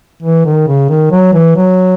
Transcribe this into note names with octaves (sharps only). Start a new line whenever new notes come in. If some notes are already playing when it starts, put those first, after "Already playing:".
E3
D#3
C#3
D#3
F#3
E3
F#3